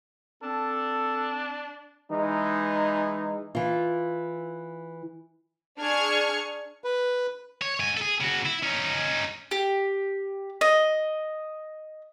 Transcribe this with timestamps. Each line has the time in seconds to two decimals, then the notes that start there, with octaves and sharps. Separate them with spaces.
0.43 C4 D4 A4
2.12 E3 G#3 D#4
3.55 E3 F4
5.80 D4 G#4 G#5 C#6 F6 G#6
6.84 B4
7.62 C#5
7.80 G#2 G#5
7.97 G#4 A4
8.21 C#3 F#4
8.46 E4
8.63 C#4 D#4
9.51 G4
10.61 D#5